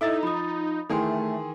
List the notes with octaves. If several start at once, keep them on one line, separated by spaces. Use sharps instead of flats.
D#4 E4 A4 E5 A6
F3 B5 D#6
D#3 E3 A3 G#4 G5 G#5 C6